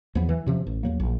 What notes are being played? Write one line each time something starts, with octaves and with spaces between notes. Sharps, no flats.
E2 F3 F#3 B3
E3
F#2 C3 F3
A1
E2 F#3 A#3
A#1